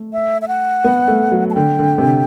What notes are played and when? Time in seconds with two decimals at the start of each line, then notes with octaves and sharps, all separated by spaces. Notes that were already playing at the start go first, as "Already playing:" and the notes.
Already playing: A3
0.13 E5
0.42 E5
0.48 F#5
0.84 B3
1.08 A3
1.32 F#3
1.50 A5
1.55 D3 G5
1.79 D3
1.98 C3
2.03 D3